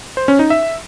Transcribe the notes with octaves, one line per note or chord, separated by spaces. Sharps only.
C5
C#4
D#4
E5